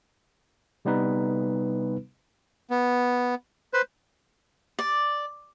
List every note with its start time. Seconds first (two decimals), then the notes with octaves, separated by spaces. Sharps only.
0.85 C3 G3 B3 D#4 B4
2.70 B3
3.74 B4 C5
4.79 D5